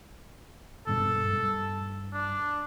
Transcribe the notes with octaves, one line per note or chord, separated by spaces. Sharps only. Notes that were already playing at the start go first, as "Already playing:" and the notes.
D#1 G2 B2 A4
G2
D4